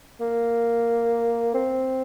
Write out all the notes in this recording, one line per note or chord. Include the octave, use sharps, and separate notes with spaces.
A#3
C4